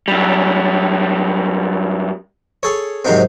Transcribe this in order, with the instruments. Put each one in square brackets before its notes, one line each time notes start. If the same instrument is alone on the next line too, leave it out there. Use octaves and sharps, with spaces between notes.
[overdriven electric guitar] F#2 G3
[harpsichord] G#4 A4 C#5
G#2 C3 D#3 F3 F#3 C4